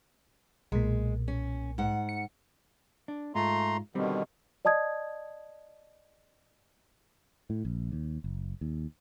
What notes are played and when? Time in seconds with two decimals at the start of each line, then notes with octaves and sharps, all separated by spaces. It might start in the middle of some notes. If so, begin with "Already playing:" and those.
0.72 B1 A#2 G#3
1.28 C#4
1.78 G#2 F#5
2.09 C#7
3.08 D4
3.35 G#2 A3 F4 A#5 C6
3.95 B2 D3 D#3 G3 C4
4.65 D5 D#5 A5 D#6 G#6
7.50 A2
7.65 A#1
7.92 D#2
8.24 F#1
8.61 D#2